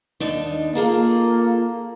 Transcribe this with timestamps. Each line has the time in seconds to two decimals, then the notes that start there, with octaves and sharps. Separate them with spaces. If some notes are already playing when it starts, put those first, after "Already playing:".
0.20 D#2 D4 D#4
0.75 A#3 F4 G#4 A4